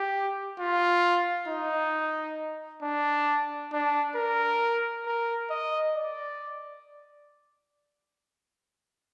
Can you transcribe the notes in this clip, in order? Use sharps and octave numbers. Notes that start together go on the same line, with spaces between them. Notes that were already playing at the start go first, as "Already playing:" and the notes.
Already playing: G4
F4
D#4
D4
D4
A#4
A#4
D#5
D5